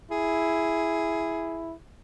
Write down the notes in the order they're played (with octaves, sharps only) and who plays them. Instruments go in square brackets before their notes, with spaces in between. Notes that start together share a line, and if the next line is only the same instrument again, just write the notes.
[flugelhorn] E4 [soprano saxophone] G#4